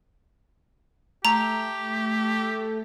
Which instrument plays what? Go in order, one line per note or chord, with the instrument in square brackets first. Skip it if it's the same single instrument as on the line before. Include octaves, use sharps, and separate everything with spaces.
[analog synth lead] A3 [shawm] G4 [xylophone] A#5